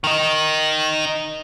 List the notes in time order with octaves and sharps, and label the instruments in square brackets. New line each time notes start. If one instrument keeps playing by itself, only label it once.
[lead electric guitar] D#3 D#4